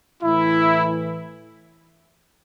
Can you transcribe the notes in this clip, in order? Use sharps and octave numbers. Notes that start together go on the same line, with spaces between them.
A2 E3 E4